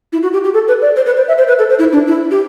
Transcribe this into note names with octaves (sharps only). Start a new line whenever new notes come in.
E4
F#4
G4
G4
A4
B4
D5
C5
B4
C5
E5
C5
B4
A4
C5
E4
D4
E4
G4